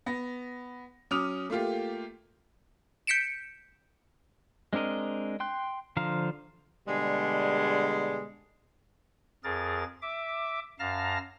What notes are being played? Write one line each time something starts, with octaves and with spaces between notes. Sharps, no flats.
B3 A#6
F#3 C#4 D6 D#6 F6 F7
A3 A#3 F4 G4
G6 B6 C#7 D7 E7
G#3 C4 D4 A#4 D#5
G5 C6 F#6
D3 F3 C5 F5 A#5
B2 D3 G3 G#3
F2 G#4 A#4 A6
E5 D6
F#2 F5 A5 A#5 F6 A#6